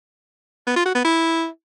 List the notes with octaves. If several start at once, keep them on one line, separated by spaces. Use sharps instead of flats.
B3
F4
F#4
B3
E4